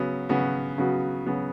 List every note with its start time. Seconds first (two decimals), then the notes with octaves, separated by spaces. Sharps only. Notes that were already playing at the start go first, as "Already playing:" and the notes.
Already playing: C#3 F#3 B3 F#4
0.29 C#3 F#3 B3 F#4
0.78 C#3 F#3 B3 F#4
1.26 C#3 F#3 B3 F#4